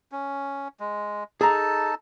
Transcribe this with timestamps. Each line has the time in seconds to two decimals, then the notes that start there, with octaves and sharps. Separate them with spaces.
0.12 C#4
0.80 G#3
1.41 D#4 G#4 A4 A5 A#5